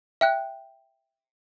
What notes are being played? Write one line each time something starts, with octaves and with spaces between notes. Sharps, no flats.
E5 G5 F#6